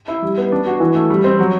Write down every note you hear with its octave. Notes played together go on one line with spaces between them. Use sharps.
E4
G3
B3
D4
F#4
E3
A3
G3
C4
F#3